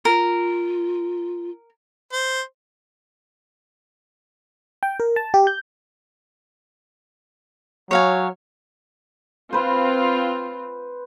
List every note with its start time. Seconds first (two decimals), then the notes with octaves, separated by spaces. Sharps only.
0.05 F4 A#4
2.13 C5
4.83 G5
5.00 A#4
5.16 A5
5.34 G4
5.47 G6
7.91 F#3 C#5 F5 G#5
9.53 C4 F4 B4 C5